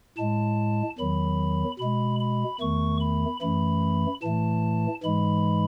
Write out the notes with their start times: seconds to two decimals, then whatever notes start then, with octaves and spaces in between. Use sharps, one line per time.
0.17 A2 G#3 A5
0.98 E2 D#3 F#3 B5
1.79 B2 G#3 B5
2.20 B5
2.60 E2 D#3 A3 C#6
3.00 B5
3.41 F#2 E3 A3 B5
4.22 A2 E3 A3 A5
5.03 G#2 E3 G#3 B5